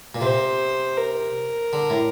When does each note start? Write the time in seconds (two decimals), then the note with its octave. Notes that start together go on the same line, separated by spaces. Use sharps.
0.15 A#2
0.21 C3 C5
0.97 A#4
1.73 D3
1.90 A2